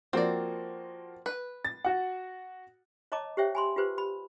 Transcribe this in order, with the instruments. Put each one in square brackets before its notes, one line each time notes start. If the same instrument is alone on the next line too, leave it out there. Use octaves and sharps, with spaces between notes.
[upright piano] F3 A#3 F#4 [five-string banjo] C4 D5
[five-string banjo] B4
[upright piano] A6
F#4 F#5
[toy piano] C#5 D#5 A5 A#5 D6
G4 C5 C#5 E5 G5
G#5 B5 C6
F4 G4 B4 C5
B5